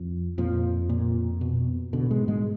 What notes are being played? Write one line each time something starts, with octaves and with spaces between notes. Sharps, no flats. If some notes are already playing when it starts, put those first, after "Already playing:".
Already playing: F2 F3
F2 A#2 F3
A#2
B2
B2 D3
G#2 G#3
G#2 G#3